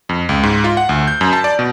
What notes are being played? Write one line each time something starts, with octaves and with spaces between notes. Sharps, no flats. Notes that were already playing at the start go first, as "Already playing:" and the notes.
F2
C#2
G#2
F4
F#5
D2
G6
F#2
A5
D5
B2